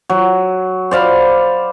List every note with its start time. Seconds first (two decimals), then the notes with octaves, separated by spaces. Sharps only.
0.10 F#3
0.91 C5 D5 F5 B5